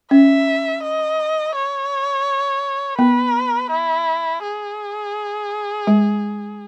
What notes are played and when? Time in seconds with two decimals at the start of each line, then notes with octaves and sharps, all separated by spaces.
0.11 C#4 E5
0.83 D#5
1.55 C#5
2.98 B3 B4
3.71 E4
4.43 G#4
5.87 G#3